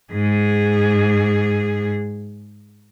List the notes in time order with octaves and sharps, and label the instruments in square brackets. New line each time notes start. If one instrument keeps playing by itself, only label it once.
[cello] G#2 G#4